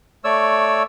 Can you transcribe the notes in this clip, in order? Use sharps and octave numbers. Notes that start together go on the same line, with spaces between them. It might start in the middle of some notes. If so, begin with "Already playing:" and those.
A3 C#5 D5 E6